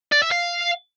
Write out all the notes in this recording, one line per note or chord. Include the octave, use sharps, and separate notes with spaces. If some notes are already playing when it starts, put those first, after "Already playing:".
D5
E5
F5